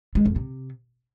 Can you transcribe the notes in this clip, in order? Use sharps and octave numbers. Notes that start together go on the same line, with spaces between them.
G#3
F2
C3